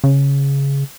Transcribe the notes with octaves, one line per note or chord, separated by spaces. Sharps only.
C#3